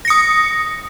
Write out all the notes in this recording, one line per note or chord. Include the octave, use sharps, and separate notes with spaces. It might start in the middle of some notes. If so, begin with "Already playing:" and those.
D#6 A#6 C#7